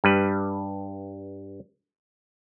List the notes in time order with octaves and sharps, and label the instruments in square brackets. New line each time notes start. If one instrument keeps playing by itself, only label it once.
[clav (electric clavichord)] G2 G3 B4